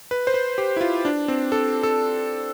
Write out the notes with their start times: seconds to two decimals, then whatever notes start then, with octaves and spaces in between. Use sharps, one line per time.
0.11 B4
0.27 C5
0.34 B4
0.58 G4
0.77 E4
0.81 F4
1.05 D4
1.28 C4
1.52 A4
1.83 A4